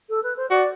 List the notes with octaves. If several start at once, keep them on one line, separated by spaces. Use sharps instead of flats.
A4
B4
C5
F#4 D5